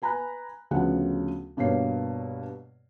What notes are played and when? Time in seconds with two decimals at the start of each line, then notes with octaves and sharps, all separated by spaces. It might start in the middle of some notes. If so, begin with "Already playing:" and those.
0.02 B4 G#5 A#5 B5 F#6
0.71 D2 C#3 F3 A3 B3 F#5
1.57 G2 B2 A#3 C#5 C7